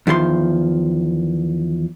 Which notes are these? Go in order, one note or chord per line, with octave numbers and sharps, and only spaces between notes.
E2 D#3 F3 C6